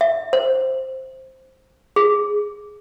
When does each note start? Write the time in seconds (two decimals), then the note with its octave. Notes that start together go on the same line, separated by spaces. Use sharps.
0.01 E5
0.33 C5
1.96 G#4